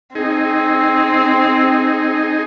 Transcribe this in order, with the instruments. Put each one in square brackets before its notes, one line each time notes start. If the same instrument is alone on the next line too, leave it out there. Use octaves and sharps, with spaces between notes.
[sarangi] C4 [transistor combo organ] D#4 G#4